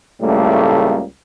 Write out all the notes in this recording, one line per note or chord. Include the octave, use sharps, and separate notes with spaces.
C#2 A2 C#3 G3 A3 A#3